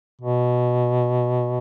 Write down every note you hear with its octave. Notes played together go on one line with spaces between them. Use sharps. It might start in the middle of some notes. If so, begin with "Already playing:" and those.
B2